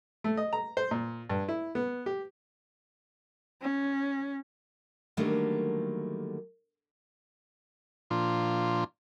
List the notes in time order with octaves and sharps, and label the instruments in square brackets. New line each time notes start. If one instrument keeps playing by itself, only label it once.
[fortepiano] A3
D#5
A#5
C5
A#2
G2
E4
B3
G4
[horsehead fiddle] C#4
[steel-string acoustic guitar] D3 D#3 F#3 G3 A3 A#3
[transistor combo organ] A#2 F3 D4 F4